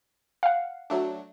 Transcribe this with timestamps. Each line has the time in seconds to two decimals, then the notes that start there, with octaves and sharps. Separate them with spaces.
0.43 F5 F#5
0.90 F#3 A3 D4